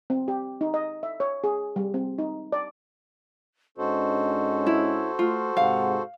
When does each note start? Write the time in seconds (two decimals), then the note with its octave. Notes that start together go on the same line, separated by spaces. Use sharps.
0.10 C4
0.28 G4
0.61 D#4
0.74 D#5
1.03 E5
1.20 C#5
1.44 G#4
1.76 G3
1.94 C4
2.18 D#4
2.52 D5
3.78 G#2 C#4 D4 F#4 A4 C5 D#5
4.66 E4
5.19 A3 F4
5.57 G#2 C3 F5 F#5